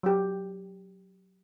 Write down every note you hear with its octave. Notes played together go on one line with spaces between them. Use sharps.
F#3 G4